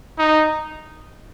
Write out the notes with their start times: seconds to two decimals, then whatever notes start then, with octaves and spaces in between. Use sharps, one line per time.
0.19 D#4